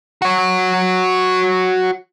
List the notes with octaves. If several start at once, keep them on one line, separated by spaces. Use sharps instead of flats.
F#4 C#5